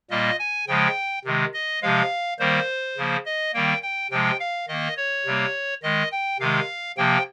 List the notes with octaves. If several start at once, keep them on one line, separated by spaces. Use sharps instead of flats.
A#2 G3 A#3 D#5
G#5
C#3 F3 G#3 G5
C3 D#3 G#3
D#5
C3 F3 G#3 F5
D#3 G3 A#3 C5
C#3 F3 A#3
D#5
D#3 G3 A#3 G5
G5
C3 F3 G#3 G5
F5
D#3 A#3 D#5
C#5
C3 G3 A#3
D#3 G#3 D#5
G5
C3 D#3 G#3 F5
C3 F3 A#3 G5